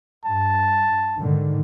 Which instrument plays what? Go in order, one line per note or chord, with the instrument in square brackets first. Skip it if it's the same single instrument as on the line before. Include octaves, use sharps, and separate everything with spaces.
[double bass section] G2 [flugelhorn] A5
[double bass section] G#2 D3 D#3